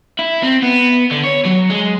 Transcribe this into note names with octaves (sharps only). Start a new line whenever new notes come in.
E4
C4
B3
D3
C#5
F#3
G#3